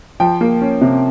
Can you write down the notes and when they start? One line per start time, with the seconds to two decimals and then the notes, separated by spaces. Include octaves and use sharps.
0.20 F3 G5
0.41 A#3
0.61 C#4
0.81 C3